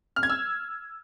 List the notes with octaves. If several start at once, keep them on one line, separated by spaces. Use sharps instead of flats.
F6
G#6
E6